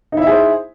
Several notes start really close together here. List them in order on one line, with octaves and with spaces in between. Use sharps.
D#4 E4 E5 G#4 C5